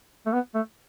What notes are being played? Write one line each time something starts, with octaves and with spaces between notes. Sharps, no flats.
A3
B3
A3